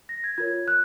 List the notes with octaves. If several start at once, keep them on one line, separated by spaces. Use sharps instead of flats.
A#6
G#6
F4 A#4 C#5 G#6
F#6